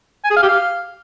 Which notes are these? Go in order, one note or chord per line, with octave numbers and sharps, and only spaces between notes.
G#5
G#4
F5
G4
F5